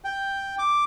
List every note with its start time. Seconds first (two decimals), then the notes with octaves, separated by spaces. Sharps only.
0.04 G5
0.59 D6